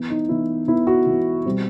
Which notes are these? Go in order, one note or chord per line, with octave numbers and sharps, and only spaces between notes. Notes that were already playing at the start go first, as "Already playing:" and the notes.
Already playing: E3 B3
D#4
E3 B3 E4
E3 B3 E4
F#4
E3 B3
B2 G3 C4